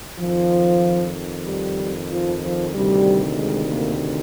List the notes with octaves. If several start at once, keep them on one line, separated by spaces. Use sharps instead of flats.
F2 D#3 F3
G3
F3
F3
D2 C3 D#3 G3
G#3
A#3